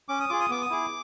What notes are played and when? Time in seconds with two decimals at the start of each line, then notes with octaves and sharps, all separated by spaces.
0.09 C#4 D6
0.20 D#6
0.29 F4 G#4 D6
0.40 D#6
0.49 B3 D6
0.62 D#6
0.70 E4 G#4 D6